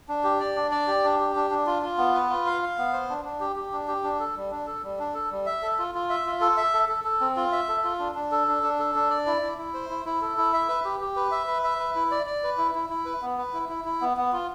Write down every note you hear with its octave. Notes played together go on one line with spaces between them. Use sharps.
D4
G4
D5
D4
D5
G4
D4
G4
D4
D4
F4
F4
B3
B4
F4
F5
F5
B3
C5
D4
D4
G4
G4
D4
G4
D4
A4
G3
D4
A4
G3
D4
A4
G3
E5
A4
F4
F4
E5
F4
A4
E5
A4
A4
A4
C4
F4
E5
A4
F4
D4
D4
A4
D4
D4
A4
D4
D5
E4
E4
E4
C5
E4
E4
A4
E4
E5
B4
G4
G4
B4
E5
B4
E5
B4
E4
D5
D5
B4
E4
E4
E4
B4
B3
B4
E4
E4
E4
B3
B3
F4